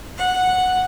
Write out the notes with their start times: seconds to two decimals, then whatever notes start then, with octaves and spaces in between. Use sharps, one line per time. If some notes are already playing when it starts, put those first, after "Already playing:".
0.17 F#5